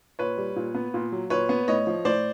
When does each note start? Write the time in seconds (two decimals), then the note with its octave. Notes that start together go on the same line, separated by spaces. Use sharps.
0.19 A#2 B4 C#5
0.38 G3
0.56 A#2
0.75 B3
0.94 A#2
1.12 F#3
1.30 A#2 B4 C#5
1.49 B3
1.68 A2 C#5 D#5
1.87 F3
2.05 A2 C5 D5